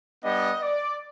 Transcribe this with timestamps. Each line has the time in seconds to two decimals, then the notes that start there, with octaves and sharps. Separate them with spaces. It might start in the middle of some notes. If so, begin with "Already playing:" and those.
0.23 G3 B3 D4 D#5
0.62 D5